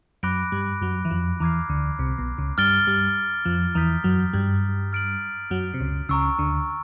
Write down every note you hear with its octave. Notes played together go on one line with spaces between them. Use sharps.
F#2 F#3 B5 D6 F#6 A#6 D7
G2 G3
F#2 F#3
E3
F2 F3
E2 E3 A#5 D6 F6 G#6 C7
D2 D3
C2 C3
B1 B2
C#2 C#3
G2 G3 F6 A6 D7 G7
G2 G3
F2 F3
E2 E3 A#5 D#6 G6 B6
F#2 F#3
G2 G3
F6 A6 D7 F#7
F#2 F#3
C3
C#2 C#3
C#2 C#3 A#5 C#6 E6
D2 D3